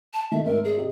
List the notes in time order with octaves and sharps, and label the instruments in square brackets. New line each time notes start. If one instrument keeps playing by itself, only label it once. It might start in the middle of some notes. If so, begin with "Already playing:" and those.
[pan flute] A5
[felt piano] D#3 A3 [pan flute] E5
[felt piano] G#1 E5 [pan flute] A#4
[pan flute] G#4
[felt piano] C3 D#5